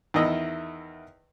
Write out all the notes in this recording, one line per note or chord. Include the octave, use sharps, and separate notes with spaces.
E2 D#3 E4 D#5 E5